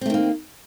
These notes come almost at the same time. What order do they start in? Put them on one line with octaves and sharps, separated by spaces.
C4 A3 D#3 A#3